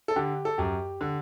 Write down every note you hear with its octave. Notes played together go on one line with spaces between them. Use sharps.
A4
D3 G4
A4
F#2 G4
D3